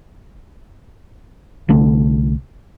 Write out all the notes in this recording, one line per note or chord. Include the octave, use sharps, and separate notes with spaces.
C2 D3 A3